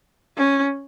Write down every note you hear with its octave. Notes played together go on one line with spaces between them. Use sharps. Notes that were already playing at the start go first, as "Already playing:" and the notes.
C#4